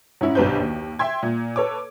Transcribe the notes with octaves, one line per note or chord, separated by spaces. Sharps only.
G#2 C#4 E4
B1 G2 D3 B4 C5 G6
D#2
E5 G5 C6 G#6
A#2
A4 B4 C#5 D6